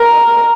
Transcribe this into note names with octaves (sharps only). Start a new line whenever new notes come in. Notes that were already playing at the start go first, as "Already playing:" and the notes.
Already playing: A#4